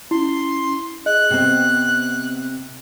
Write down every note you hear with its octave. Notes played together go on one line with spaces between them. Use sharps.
C#4 E4 C6
G#4 D#5 F#6
C3 B3 C4